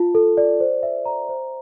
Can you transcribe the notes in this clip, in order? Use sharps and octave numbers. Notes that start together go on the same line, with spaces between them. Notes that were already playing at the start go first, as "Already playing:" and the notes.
Already playing: F4 A5
A4
D5
C5
E5
A#5
C5